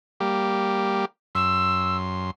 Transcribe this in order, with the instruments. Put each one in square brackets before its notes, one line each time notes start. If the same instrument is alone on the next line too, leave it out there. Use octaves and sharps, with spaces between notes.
[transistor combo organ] G3 A#3 G4
[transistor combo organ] F#2 C6 [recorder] E6